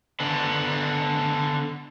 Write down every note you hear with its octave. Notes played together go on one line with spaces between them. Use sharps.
D3 B3